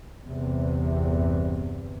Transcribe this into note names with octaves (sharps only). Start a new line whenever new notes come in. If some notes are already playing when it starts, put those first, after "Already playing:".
G1 E2 C3